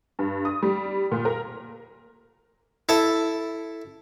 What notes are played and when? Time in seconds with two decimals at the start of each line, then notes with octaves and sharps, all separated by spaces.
0.19 G2
0.45 D#6
0.62 G3
1.12 A#2
1.25 A#4
2.89 E4 A4 A5